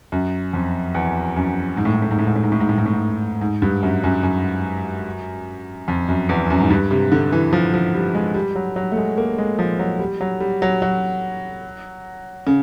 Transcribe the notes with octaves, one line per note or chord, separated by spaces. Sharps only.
F#2
F2
E2
F#2
G#2
A2
G#2
A2
G#2
A2
G#2
A2
G#2
A2
G#2
A2
G#2
A2
G#2
G#2
G2
F#2
F#2
F#2
F2
F#2
E2
F#2
G#2
G2
C3
D3
E3
F3
F3
G3
G#3
G3
F#3
F#3
A3
G#3
A#3
G#3
F3
F#3
G3
F#3
G3
F#3
F#3
C#3